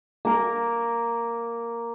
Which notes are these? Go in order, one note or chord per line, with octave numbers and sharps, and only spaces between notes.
A#3 A#4